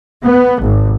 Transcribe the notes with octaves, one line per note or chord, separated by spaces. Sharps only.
B3
G#1